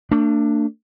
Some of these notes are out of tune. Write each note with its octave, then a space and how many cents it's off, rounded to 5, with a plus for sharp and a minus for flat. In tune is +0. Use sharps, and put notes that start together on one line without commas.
A3 +45 D4 +5